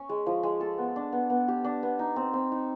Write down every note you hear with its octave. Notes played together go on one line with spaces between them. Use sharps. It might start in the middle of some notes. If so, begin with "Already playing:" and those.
Already playing: C#4
G#3
F3
G#3
A4
B3
D4
B3
B3
G4
D4
B3
D#4
C4
C4
D#4